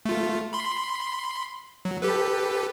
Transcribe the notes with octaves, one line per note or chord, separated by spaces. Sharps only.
A3 F4
B5 C6
F#3
G4 A4 B4